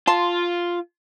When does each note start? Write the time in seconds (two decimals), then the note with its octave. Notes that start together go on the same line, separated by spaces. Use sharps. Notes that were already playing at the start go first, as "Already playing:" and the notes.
0.07 F4 A5 C6